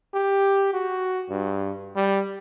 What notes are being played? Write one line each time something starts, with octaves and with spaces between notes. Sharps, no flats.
G4
F#4
G2
G3